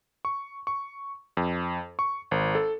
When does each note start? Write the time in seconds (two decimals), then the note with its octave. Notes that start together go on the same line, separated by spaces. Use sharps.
0.25 C#6
0.67 C#6
1.37 F2
1.99 C#6
2.31 G#1
2.55 A4